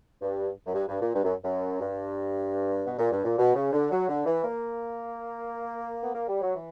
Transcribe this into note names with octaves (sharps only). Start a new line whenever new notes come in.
G2
F#2
G2
G2
A#2
G2
F#2
F#2
G2
B2
A#2
G2
A#2
B2
C#3
D3
F#3
D3
E3
A#3
B3
A#3
G3
F#3
E3